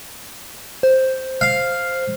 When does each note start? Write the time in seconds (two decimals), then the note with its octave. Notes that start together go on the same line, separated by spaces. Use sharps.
0.83 C5
1.41 F5